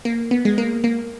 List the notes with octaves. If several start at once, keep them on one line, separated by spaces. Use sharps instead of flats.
A#3
B3
G#3
A#3
A#3